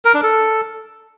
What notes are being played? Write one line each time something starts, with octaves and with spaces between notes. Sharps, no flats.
A#4
D4
A4